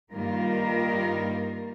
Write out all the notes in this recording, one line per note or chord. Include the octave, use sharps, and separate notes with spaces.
G2 D#3 G3 A#3 F4 A#4